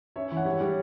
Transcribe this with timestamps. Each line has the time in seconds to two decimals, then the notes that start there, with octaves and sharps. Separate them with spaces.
0.16 C#4 C#5 E5
0.32 E3
0.37 F#5
0.45 G3 C#5 E5
0.61 G3